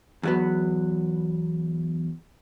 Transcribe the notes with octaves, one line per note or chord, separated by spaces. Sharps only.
E2 F#3 B3